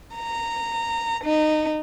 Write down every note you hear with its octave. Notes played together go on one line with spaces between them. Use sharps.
A#5
D#4